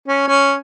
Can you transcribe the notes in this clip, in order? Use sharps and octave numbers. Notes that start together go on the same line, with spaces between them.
C#4
C#4